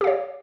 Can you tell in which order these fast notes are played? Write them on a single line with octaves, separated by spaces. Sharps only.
G4 F5 C#5